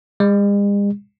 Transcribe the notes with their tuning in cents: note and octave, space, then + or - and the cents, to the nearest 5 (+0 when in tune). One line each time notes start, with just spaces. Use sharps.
G#3 -45